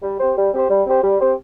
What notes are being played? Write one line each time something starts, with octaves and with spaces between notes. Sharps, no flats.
G3
C4 G4 C5
G3
C4 G4 C5
G3
C4 G4 C5
G3
C4 G4 C5